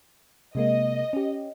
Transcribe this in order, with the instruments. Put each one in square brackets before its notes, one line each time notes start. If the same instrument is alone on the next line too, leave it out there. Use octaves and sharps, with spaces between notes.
[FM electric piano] C3 G#3 A#3 [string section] D#5
[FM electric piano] C#4 G4